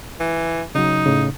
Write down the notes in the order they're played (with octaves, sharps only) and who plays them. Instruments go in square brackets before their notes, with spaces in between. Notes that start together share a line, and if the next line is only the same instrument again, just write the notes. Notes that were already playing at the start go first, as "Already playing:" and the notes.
[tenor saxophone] E3
[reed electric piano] C#3 F#3 [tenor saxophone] D#4
[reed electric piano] A2 C#3